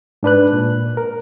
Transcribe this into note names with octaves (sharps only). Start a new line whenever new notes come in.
G#2 D4 B4 F#6
A#2
A#4